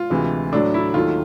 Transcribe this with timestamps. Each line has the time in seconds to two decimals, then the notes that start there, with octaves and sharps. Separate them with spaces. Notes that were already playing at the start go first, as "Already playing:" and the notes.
Already playing: F4
0.10 D2 C3 E3 G#3
0.52 A2 F#3 A3 D4
0.74 E4
0.94 D#2 D#3 F#3 A3 F4